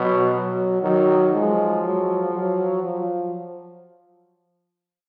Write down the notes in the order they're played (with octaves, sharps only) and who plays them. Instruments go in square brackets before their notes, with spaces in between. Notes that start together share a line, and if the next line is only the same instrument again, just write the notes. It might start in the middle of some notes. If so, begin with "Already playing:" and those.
Already playing: [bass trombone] B2 [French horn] F#3
[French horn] F#3
[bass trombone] D#3 [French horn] F#3
[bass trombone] F3 [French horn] G#3
[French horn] F#3
F#3
F3